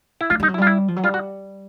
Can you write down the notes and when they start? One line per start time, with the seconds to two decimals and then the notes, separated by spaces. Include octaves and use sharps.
0.21 E4
0.30 G#3 F4
0.40 G3 D#4
0.49 F#3
0.54 E4
0.58 G3 F4
0.67 E4
0.88 F3
0.96 F#3
1.04 G3 F4
1.14 F#4